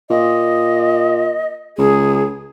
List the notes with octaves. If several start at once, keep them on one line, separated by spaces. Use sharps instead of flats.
A#2 D#5
C#2 G#4